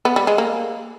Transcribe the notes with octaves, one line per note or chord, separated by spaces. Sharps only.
B3
G3
G#3
A#3